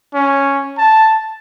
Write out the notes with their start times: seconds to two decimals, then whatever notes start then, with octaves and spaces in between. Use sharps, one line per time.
0.14 C#4
0.78 A5